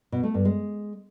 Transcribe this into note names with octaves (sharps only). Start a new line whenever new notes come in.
B2
A3
G2
G#3